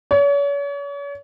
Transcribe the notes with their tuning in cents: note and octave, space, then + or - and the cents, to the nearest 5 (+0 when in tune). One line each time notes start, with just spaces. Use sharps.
C#5 +40